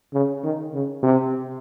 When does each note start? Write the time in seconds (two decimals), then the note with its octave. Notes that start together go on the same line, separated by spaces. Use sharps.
0.14 C#3
0.43 D#3
0.74 C#3
1.03 C3